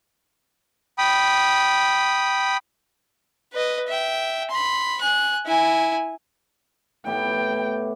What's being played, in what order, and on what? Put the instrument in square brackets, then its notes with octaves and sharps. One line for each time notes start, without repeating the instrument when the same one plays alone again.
[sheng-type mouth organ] G5 B5 D#6
[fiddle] B4 D#5
E5 G5
B5 C6
G#5 F#6
E4 G#5
[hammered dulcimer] A2 B3 G4 [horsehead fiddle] G5